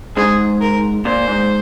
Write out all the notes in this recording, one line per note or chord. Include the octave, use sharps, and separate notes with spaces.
G#2 G#4
A#4
A#2 C5
G#2